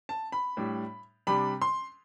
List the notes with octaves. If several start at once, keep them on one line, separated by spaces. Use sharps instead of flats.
A5
B5
A2 G3 D4
C3 G3 D4 B5
C6